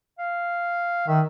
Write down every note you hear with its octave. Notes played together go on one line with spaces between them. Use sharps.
F5
D#3 E5